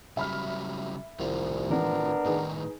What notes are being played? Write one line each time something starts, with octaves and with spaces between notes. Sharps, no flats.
C#3 F#3 G3 E5 B5 F6
C2 A2 D#3 F4
E3 G#3 B3 C4 D4 A#4
A2 D#3 D#4 G#4 B4